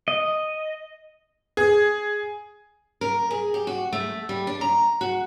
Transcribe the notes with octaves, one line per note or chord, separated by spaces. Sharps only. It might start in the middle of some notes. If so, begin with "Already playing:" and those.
D#5
G#4
A#4
G#4
G4
F#4
A3
G3
D4
A#5
F#4